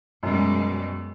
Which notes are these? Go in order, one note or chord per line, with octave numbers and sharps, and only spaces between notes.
F#2 B2 G3 G#3